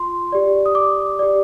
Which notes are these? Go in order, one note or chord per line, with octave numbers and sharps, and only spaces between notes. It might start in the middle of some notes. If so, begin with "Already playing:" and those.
Already playing: F4 C6
G4 D5
D#6
D6
G4 D5